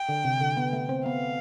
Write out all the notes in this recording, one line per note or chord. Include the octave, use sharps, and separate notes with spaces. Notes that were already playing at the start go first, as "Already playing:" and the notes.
Already playing: G5
D3
C3
D3
B3
A3
C4
B3 F5